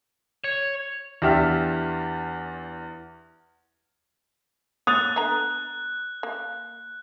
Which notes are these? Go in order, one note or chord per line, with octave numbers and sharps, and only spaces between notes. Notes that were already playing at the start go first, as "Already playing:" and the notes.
C#5
E2 D4 G4 E5 F6
C#5 D#6 F#6 A6 F7
D3 B3 A#5
A#3